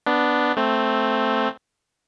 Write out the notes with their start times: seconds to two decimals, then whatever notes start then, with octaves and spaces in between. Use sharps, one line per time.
0.06 B3 D4
0.57 A3 C4